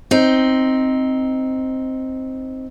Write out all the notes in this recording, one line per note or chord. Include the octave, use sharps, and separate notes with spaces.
C4 D#4